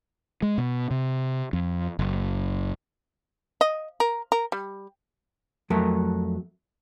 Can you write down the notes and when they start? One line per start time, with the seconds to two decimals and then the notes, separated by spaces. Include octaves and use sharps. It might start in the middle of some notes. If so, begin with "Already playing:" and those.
0.42 G#3
0.58 B2
0.91 C3
1.53 F2
1.99 F#1
3.61 D#5
4.00 A#4
4.32 A#4
4.52 G3
5.70 F2 F#3 A3 A#4